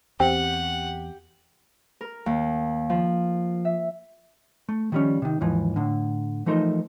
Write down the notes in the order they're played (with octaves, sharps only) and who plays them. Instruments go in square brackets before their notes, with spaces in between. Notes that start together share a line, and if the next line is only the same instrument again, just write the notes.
[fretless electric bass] E2 [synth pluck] C4 [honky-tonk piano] G4 [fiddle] F#5
[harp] A#4
D#2
F3
E5
[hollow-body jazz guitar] A3
D#3 F3 G3 C4 C#4
C3 D#3
D#2 G#2 E3 F3
A2 D3
E3 F3 A3 D#4 A#4 C5